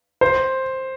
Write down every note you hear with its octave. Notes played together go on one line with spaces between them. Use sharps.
C5